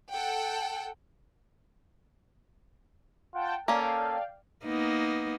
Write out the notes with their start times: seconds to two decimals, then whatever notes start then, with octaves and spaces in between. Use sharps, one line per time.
0.11 A4 F#5 G5
3.34 F4 F#5 G5 A5
3.68 A#3 C#4 A4 D5 F5 G5
4.65 A#3 B3 D#4